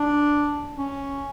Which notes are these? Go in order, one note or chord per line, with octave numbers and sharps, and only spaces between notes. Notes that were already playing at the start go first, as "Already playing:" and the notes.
Already playing: D4
C#4